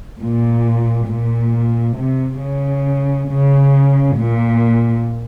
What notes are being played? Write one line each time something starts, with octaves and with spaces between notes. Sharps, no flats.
A#2
A#2
C3
C#3
C#3
A#2